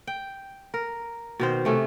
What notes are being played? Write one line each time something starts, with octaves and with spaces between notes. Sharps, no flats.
G5
A#4
B2 D#3 C5
C3 A3 C#4